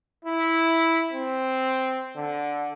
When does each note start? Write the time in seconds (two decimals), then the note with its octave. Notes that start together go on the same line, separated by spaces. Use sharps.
0.25 E4
1.13 C4
2.16 D3